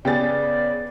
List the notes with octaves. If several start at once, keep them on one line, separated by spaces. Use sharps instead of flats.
C#3 B3 G#4 D5 G5 A6